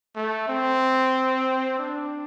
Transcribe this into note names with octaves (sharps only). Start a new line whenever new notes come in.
A3
C4
D4